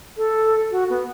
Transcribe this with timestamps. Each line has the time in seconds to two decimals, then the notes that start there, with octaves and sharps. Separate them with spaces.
0.17 A4
0.71 F#4
0.90 B3